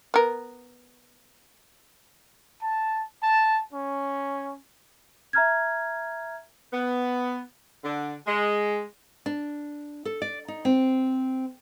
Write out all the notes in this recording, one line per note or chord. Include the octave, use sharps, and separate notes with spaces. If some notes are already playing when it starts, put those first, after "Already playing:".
B3 A#4
A5
A5
C#4
E5 A#5 F6 G#6
B3
D3
G#3
D4
A4
D5
D#4
C4